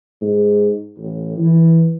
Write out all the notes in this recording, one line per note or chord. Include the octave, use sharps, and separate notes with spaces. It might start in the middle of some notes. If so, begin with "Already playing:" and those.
G#2
A1
E3